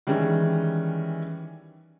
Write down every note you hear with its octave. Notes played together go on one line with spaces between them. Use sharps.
D#3 E3 G3 G#3 C#4